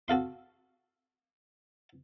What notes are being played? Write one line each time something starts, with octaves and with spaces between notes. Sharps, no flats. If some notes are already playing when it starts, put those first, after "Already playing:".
F#4 A4 F5 C6